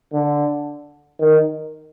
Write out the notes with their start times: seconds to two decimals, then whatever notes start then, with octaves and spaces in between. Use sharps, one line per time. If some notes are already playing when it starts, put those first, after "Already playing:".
0.13 D3
1.20 D#3